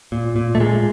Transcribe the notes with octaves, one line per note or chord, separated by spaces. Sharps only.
A#2
A#2
A3
A#2 G#3